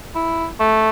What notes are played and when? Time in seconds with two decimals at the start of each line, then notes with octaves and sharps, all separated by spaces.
0.15 E4
0.60 A3